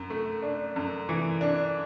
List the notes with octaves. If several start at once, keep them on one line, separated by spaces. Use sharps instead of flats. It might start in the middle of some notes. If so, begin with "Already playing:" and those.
Already playing: F#2
A3
D4
F#2
E3
D4